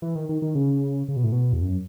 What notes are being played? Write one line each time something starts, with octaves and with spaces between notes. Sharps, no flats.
E3
D#3
D#3
D#3
C#3
C#3
B2
A2
B2
E2
F#2